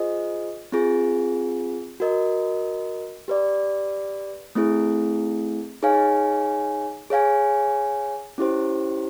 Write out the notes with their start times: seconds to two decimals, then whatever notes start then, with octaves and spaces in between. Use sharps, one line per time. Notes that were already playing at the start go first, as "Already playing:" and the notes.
Already playing: F4 G#4 C5 D#5
0.72 C4 F4 G#4
2.00 F#4 A#4 D#5
3.28 G4 B4 D5
4.55 A3 C4 E4 G#4
5.82 D#4 G#4 C#5 F5 G#5
7.10 G#4 C#5 F5 G#5
8.38 C#4 E4 G4 C5